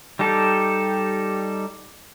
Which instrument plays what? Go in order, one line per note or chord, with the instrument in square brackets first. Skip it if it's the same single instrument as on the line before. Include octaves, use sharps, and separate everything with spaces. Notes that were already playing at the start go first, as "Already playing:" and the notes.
[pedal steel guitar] G3 D#4 G4 A4